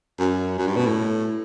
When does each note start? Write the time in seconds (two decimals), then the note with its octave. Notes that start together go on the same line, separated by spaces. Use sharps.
0.19 F#2
0.58 F#2
0.68 G2
0.76 B2
0.86 A2